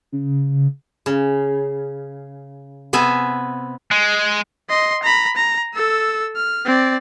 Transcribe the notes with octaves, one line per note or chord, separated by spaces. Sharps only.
C#3
C#3
C3 B3 E5 G#5
G#3
D#5 C6
A#5 B5
A#5
A4 E6
F6
C4 D5